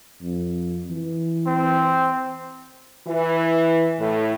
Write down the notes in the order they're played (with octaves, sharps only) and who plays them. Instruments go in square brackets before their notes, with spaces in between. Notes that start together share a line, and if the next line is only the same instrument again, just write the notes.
[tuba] F2
E3
[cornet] C4
[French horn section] E3
A2